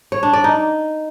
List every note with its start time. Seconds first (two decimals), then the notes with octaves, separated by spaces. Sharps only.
0.12 C#5
0.23 D4
0.33 D5
0.44 D#4